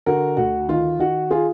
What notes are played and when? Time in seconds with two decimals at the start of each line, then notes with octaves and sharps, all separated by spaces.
0.06 D3 F#4 A#4
0.37 D2 F#4
0.69 D#3 F4
0.99 D#3 F#4
1.30 F4 G#4